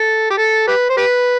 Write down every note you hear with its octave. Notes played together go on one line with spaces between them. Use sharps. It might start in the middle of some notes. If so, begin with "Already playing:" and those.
Already playing: A4
G4
A4
G4 B4
C5
G4 B4